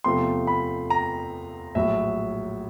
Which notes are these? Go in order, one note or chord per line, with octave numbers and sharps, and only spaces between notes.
E2 C3 F3 A3 C4 C6
B5
A#5
A#1 A2 F#3 E5